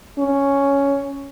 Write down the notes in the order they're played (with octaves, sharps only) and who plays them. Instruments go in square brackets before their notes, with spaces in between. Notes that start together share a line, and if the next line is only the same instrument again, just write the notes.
[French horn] C#4